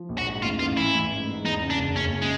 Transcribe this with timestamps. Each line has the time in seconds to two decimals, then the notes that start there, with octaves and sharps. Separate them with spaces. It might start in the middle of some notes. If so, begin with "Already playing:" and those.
Already playing: F3
0.09 A#1
0.18 F#4
0.27 G#2
0.42 A1 F4
0.60 A1 F4
0.77 E3 E4
0.94 A1
1.11 G#2
1.28 G#2
1.45 E2 D#4
1.62 C#3
1.70 D4
1.79 F#1
1.96 F#1 C#4
2.13 C#3
2.22 G#3